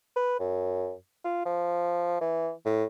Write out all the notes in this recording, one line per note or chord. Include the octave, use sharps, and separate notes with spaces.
B4
F#2
F4
F3
E3
A2